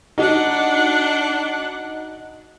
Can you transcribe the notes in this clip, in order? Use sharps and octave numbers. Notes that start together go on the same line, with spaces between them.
D4 D#4 F#4 F#5